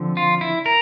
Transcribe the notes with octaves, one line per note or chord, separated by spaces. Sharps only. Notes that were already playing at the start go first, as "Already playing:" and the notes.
Already playing: D3 F3 C4
F4
E4
A#4